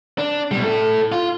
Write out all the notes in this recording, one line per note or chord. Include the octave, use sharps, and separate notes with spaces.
D4
B2 G3
E4 A4
F4